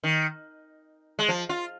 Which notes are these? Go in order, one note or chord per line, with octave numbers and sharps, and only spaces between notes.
D#3
G#3
F3
F4